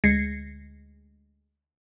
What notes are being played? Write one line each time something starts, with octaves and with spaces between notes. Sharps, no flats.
D2 G#3 G#6 A#6 C7 C#7